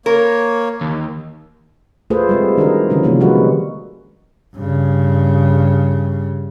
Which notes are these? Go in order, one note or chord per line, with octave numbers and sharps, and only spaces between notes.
A#3 A#4 C#5
D#2
A3 F4 G#4 A4 B4 C5
G3 G#3 C4
D#3 D4 D#4 F#4 G#4 A#4
D3 E3 G3 C#4
C3 D#3 F3 A#3 D#4 F4
D#3 G3 G#3 F#4 B4
G2 C#3